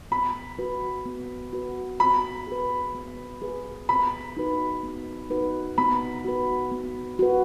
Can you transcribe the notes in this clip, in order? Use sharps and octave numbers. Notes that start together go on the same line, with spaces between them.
B3 B5
F#4 B4
B3
F#4 B4
B3 B5
G#4 B4
B3
G#4 B4
B3 B5
D#4 F#4 B4
B3
D#4 F#4 B4
B3 B5
F#4 B4
B3
F#4 B4